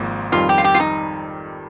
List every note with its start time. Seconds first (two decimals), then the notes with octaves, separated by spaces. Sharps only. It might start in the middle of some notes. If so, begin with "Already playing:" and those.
Already playing: G#1 G#2 F3 A#3
0.32 F2 D#3 G3 F4
0.49 G4
0.58 F4
0.64 G4
0.74 F4
0.80 D#4